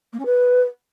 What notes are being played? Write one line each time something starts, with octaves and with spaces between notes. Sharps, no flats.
A#3
C#4
B4